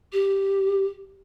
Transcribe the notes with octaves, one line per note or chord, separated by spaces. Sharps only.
G4